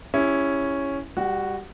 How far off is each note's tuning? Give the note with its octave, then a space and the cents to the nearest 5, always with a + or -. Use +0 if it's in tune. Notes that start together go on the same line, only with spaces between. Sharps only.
C#4 +0 E4 +0 G4 +40
G3 +15 F#4 +0 G5 -40